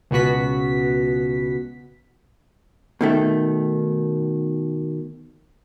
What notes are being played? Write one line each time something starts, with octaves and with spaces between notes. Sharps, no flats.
C#2 B2 B3 F#4 B6
B2 D#3 A3